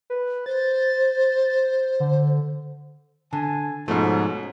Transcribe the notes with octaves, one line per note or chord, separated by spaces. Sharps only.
B4
C5 A6
D3
D3 G#5 A5
G#2 B2 F3 A3 C#4